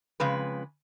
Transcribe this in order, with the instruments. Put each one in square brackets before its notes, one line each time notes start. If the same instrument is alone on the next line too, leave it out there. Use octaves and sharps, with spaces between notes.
[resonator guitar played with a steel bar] F2 C#3 G#3 B4